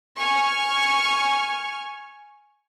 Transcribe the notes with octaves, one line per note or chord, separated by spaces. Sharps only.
G#5 C#6 F6